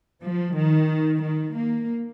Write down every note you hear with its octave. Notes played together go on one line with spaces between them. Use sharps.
F3
D#3
D#3
A#3